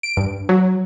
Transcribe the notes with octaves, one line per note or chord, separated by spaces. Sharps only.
D7
G2
F#3